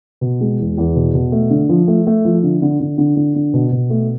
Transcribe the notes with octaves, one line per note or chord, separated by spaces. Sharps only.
B2
G#3
E2
E2
B2
B2
A3
D3
F3
A3
A3
F3
D3
D3
D3
D3
D3
D3
B2
B2
A3